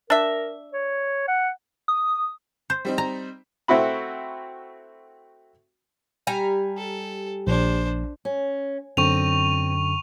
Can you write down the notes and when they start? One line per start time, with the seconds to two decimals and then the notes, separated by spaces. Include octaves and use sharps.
0.10 D4 A#4 E5
0.73 C#5
1.28 F#5
1.88 D#6
2.70 C5
2.85 G3 C4 D#4
2.98 A#5
3.68 A3 C4 E4 F#4 B5
6.27 G3 G#5 A#5
6.77 A4
7.47 A#1 D4 C5
8.25 C#4
8.97 F#2 D3 C4 C#6 D#7 F7